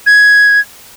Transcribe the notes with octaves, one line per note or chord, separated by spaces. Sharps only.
G#6